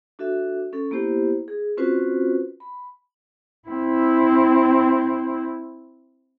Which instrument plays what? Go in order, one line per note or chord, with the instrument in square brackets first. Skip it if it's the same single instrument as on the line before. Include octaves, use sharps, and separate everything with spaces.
[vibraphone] D4 F#4 A4 E5
C#4 A4
A#3 B3 E4 G4 C5
G#4
C4 C#4 F4 F#4 B4 C5
B5
[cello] C4 E4